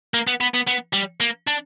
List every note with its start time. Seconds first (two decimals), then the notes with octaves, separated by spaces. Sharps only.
0.14 A#3
0.27 B3
0.41 B3
0.54 B3
0.68 B3
0.93 G3
1.21 A#3
1.47 D4